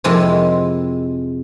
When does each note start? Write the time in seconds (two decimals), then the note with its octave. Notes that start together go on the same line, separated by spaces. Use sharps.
0.04 F2 C3 G#3 C4 E4